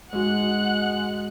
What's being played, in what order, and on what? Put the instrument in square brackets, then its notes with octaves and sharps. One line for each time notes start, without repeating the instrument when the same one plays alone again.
[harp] G#2 F#4 [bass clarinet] G#3 [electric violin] F#5 F#6